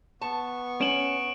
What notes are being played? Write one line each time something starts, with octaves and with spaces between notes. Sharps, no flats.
B3 A5 C#6
C#4 D7 E7 F#7